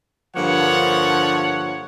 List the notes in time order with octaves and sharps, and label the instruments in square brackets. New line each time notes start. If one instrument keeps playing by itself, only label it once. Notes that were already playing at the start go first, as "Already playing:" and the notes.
[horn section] G2 D3 F3 A#3 C#5 F#5